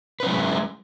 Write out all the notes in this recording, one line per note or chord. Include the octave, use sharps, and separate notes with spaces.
F#3 G#3 C#4 E4 B4